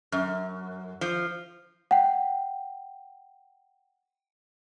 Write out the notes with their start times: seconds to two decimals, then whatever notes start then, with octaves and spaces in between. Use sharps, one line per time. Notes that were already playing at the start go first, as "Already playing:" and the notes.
0.12 F#2
1.01 F3
1.91 F#5 G5